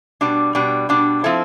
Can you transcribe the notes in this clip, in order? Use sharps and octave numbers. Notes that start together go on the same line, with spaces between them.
B2 G3 D4
B2 G3 D4
B2 G3 D4
F3 C4 E4 A4